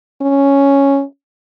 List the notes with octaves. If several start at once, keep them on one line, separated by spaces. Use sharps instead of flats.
C#4